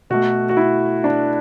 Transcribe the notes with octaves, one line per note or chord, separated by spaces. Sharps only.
B2 A3 F#4
F#4
E4
D4